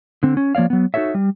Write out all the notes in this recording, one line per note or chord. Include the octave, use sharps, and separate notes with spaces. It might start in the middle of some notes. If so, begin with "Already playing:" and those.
D3 C4
C#4
F3 A#3 C#5 D5 F5
F#3 B3
D#4 F#4 A4 C#5 E5
G3